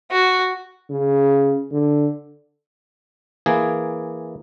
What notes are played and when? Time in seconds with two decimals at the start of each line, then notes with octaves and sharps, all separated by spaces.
0.11 F#4
0.90 C#3
1.71 D3
3.46 E3 A#3 G#4